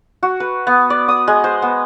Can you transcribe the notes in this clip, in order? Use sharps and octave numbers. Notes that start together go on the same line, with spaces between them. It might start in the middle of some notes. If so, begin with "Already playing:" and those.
F#4
B4
B3
D5
D#6
G#3
C5
B3